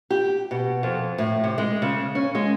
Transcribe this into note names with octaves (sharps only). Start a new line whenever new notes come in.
G4
B2
F2
A2
C3
G#3
C#3
C#4
G#3